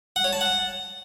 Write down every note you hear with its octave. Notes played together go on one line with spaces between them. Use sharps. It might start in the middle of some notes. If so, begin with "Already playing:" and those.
F#5
C#5
A5
F#5